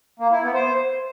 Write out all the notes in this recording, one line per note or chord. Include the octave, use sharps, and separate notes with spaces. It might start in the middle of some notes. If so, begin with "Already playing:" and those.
A#3
E4
B3
C5